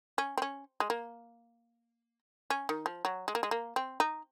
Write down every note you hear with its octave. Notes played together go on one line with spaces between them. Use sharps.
C#4
C4
C#4
G#3
A#3
C#4
D#3
F3
F#3
G#3
A#3
G#3
A#3
C4
D#4